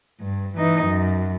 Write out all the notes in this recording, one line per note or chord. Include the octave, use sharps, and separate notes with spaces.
G2
E3 D#4
F#2